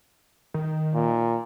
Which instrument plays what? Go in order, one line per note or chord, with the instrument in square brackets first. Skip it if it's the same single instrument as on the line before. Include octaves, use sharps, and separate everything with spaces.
[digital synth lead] D#3
[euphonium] A#2